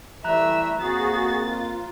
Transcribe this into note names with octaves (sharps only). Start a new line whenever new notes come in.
E3 G3 A3 E5 A#5 E6 F#6
F2 A#3 F#4 G#4 A6
F4